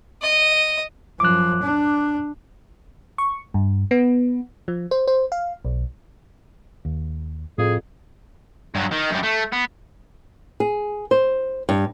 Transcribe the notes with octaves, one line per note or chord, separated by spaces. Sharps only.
D#5
F#2 F3 D6 F#6
D4
C#6
G2
B3
F3
C5
C5
F5
B1
D#2
F2 A2 G#4
G2 F#3
D#3
F#2 G3
A3
B3
G#4
C5
G2